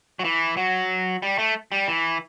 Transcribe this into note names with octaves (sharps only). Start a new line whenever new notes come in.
F#3
E3
F#3
G3
A3
G3
E3